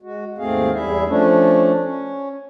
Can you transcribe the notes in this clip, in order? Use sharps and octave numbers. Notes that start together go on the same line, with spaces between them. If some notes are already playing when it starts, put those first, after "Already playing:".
G#3 F#4
D#2 G#2 A3 C4 G#4 F5
E2 G3 E4 G#4 E5
F3 A3 C#4 D4
C#4